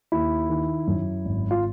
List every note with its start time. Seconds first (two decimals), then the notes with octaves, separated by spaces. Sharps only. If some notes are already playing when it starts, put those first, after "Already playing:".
0.12 D#2 E4
0.49 D#3
0.87 F#2
1.25 G#1
1.51 F4